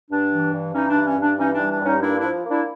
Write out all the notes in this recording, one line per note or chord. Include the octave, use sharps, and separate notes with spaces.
G2 D4
E3
G2
E3 C#4 D#4
D4
G2
C#4
G2
D4
E3 C#4 D#4
D4
G3
D4
G2 C#4 D#4
A#3 D4 E4
D4 E4
F3
A#3
D4 E4